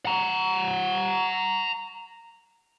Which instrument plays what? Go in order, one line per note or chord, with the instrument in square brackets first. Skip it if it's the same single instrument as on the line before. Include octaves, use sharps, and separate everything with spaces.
[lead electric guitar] F#5 A#5